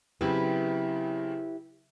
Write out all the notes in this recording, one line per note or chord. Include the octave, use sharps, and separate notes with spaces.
C#3 F#3 C4 E4 G4 B4